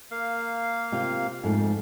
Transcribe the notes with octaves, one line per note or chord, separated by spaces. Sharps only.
A#3 F5
C3 F4 G4
F2 G#2 A3